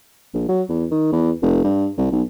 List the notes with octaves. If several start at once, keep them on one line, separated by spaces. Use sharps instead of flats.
A#1
F#3
E2
D#3
E2
F1
G2
C2
B1